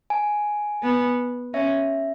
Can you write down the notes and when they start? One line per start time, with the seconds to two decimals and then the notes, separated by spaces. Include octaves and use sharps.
0.10 G#5
0.83 B3
1.54 C#4 E5